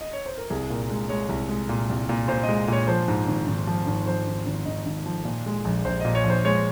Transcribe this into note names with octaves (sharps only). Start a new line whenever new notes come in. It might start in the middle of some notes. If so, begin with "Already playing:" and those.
D#5
C#5
C5
A#4
C2 G#4
A#2 A#4
G#3
G#3 C#5
C2
G#3
A#2
C2
A#2
A#2 C5
D#5
G#3
A#2 C#5
F3 C5
G#2
G#1
G#1
F3
G#1
F3 C5
G#1
G#1
G#1 D#5
G#1
F3
A#2
G#3
A#1
A#1 C5
A#2 D#5
C#5
A#1
C5
G#3 C#5